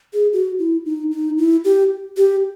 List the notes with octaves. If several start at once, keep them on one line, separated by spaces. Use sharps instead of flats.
G#4
F#4
E4
D#4
D#4
E4
G4
G4